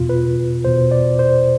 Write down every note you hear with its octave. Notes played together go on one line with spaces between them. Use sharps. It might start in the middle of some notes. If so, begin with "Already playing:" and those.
Already playing: E2 B2 F4
B4
E2 B2 C5
D5
C5